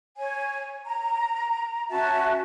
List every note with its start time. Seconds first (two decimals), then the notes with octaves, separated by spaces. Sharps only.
0.17 C#5 G#5
0.84 A#5
1.90 C#4 F#4 E5 A5